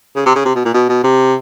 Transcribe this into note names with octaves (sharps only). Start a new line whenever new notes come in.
C#3
C3
C#3
C3
B2
A#2
B2
B2
C3